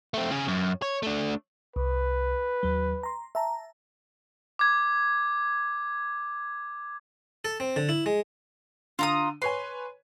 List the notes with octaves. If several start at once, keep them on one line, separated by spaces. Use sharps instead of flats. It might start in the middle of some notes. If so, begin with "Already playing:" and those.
A3 C4
C#3 G#4
F#2
C#5
A3 D4
C2 B4
D#2 F#3
A#5 C6
E5 A5 A#5
D6 G#6
A4
C4
D3
E4
G#3
D3 F4 A#5 D#6
B4 C#5 G#5 C6